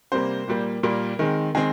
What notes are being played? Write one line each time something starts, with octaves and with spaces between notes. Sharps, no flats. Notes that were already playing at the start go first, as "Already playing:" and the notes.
C3 G3 A#3 C5
A#2 G3 A#3
A#2 G3 A#3 A#4
D#3 G#3 C4
D#3 G#3 C4 G#4